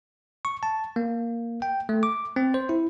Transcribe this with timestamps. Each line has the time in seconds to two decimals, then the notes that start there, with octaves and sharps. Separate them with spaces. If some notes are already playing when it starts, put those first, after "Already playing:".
0.45 C#6
0.63 A5
0.96 A#3
1.62 G5
1.89 A3
2.03 D6
2.36 C4
2.54 C5
2.69 E4